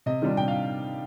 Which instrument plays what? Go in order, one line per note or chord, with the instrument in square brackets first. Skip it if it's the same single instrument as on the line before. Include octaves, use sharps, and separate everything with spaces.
[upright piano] C3 D#5
D#3 G3 D4 F4
C3 G5
F5